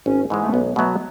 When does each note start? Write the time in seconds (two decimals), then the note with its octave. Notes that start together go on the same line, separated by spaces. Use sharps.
0.06 G#1 C#4
0.30 G#2 E3 G#3
0.43 A3
0.53 B1 B3
0.76 B2 F#3 A3 B3